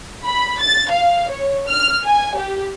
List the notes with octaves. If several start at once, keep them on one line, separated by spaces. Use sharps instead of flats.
B5
A6
F5
C#5
F6
G#5
G4